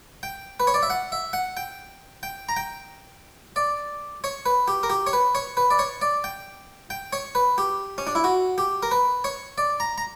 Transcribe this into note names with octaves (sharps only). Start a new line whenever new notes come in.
G5
B4
C#5
D5
E5
F#5
E5
F#5
G5
G5
A#5
G5
D5
C#5
B4
G4
A#4
G4
C#5
B4
C#5
B4
D5
C#5
D5
G5
G5
C#5
B4
G4
C#4
D4
E4
F#4
G4
A#4
B4
C#5
D5
A#5
A#5